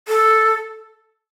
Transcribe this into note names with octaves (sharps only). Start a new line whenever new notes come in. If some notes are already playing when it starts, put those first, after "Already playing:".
A4